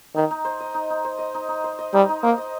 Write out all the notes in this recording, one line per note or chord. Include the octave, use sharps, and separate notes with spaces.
D#3 D#4
D#4
C5
D#5
D#4
D#4
C5
D#5
D#4
D#4
C5
D#5
G3 D#4
D#4
A#3 C5
D#5